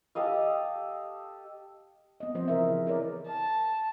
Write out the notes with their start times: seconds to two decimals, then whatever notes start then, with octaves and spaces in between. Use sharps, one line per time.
0.15 G4 A4 D#5 F5
2.20 B3 D#5
2.35 F3 C4 C5 D#5
2.48 C#3 E3 E4 A#4 D#5 E5
2.68 G#4
2.86 E4 G#4 A#4 B4 C#5 D5
3.27 A5